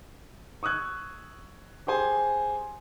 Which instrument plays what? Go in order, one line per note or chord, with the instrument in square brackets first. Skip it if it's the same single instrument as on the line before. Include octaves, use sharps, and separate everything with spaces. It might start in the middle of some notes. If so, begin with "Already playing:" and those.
[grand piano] C#6 D#6 E6 F#6 G#6
G4 G#4 C5 G#5